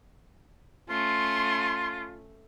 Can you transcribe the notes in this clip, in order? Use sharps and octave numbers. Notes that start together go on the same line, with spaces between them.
A3 C#4 F4 C6